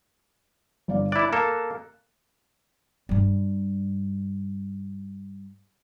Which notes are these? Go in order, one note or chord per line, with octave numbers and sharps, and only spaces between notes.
G1 D5 F5
E4 D5 F#6
A#3 A4 E7
G2 G3